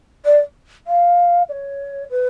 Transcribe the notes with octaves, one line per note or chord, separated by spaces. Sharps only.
D5
F5
D5
C#5
B4